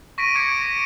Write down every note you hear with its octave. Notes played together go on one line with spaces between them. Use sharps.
C#6 A#6 B6 D7 D#7
C#6 D6 G#6 A#6 C#7 D7
A#6 B6